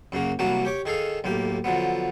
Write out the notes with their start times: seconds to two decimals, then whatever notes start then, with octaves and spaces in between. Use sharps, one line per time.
0.12 F#2 C#3 A#3 F#4
0.39 C2 E3 F#3 A#3 F#4 A5
0.65 G4 C#5 D6
0.85 D#3 G#4 A4 F5
1.24 B1 A2 A#3 G4
1.64 D3 F3 F#3 B3